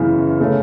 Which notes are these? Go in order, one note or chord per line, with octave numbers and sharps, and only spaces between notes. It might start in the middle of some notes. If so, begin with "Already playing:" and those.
Already playing: F#2 C#3 E3 B3
C#3 A3 C#4